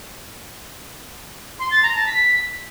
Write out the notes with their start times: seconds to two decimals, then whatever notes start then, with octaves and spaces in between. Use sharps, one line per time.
1.59 C6
1.71 A6
1.83 A#5
1.95 A5
2.06 B6